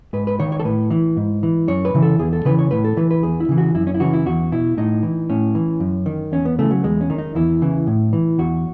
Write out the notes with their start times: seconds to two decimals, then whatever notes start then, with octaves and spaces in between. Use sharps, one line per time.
0.13 G#2 B4
0.27 B4
0.40 D#3 C#5
0.52 C#5
0.60 A4
0.65 A2 B4
0.91 E3
1.17 G#2
1.43 E3
1.68 F#2 C#5
1.85 B4
1.94 C#3 E3
2.02 A4
2.19 E2 G#4
2.33 A4
2.45 C#3 E3 B4
2.59 C#5
2.71 A2 B4
2.85 A4
2.97 E3 B4
3.11 B4
3.23 E2 G#4
3.40 E4
3.49 C#3 E3
3.58 F#4
3.75 F#2 E4
3.87 C#4
3.95 E4
4.00 C#3 E3 F#4
4.13 E4
4.26 E2 F#4
4.52 B2 E4
4.78 A2 D#4
5.03 E3
5.30 A2 C#4
5.55 E3
5.80 F#2
6.06 D#3
6.32 E2 C#4
6.45 B3
6.59 C#3 E3 A3
6.71 F#3
6.84 E2 G#3
7.01 C#4
7.10 D#3
7.18 D#4
7.35 E2 E4
7.62 C#3 E3
7.87 A2
8.13 E3
8.39 E2 F#4